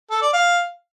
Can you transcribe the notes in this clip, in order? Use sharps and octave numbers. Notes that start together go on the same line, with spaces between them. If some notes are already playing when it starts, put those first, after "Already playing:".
A4
D5
F5